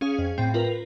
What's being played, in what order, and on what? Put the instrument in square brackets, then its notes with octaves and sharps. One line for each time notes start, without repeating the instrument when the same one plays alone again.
[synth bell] C#4 G#4 F5 [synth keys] D#6
[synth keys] F2
[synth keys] A2 G5 [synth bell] C4
[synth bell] F4 A#4 B4